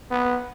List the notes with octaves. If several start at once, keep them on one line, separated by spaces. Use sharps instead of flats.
B3